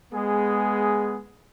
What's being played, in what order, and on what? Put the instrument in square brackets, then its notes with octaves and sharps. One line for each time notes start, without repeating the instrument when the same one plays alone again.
[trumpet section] G#3 B3 G#4